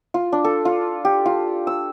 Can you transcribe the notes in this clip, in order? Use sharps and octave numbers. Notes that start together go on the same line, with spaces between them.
F4
D4
A4
F4
G4
F4
E6